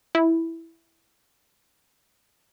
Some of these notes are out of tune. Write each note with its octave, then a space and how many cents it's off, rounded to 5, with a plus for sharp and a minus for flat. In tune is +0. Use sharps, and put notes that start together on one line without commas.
E4 +0